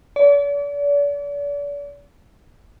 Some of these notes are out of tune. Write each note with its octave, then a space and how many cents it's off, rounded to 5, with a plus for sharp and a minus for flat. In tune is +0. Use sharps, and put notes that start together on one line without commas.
D5 -40